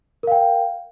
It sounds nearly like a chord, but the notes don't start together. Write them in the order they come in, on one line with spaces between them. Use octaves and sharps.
A#4 F5 G5